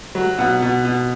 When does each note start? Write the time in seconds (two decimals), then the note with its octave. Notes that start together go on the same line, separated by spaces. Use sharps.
0.15 F#3
0.38 B2 F#5
0.62 B2
0.85 B2